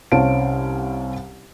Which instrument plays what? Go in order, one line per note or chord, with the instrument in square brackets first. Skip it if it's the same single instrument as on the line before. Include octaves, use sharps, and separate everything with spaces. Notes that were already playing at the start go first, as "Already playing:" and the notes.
[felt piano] C2 C#4 C5 F5 A5 D7